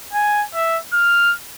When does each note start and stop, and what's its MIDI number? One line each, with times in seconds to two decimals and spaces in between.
0.13 0.44 80
0.54 0.78 76
0.93 1.34 89